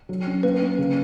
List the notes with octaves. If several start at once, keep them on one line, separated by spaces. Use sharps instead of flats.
F#3
C#4
A#3 B4
A#3
C#3